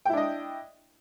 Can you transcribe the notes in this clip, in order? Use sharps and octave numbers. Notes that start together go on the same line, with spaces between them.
D4 E4 D#5 G5